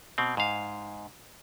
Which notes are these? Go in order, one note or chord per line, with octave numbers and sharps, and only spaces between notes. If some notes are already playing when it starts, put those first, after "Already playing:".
B2 C4
G#2 F5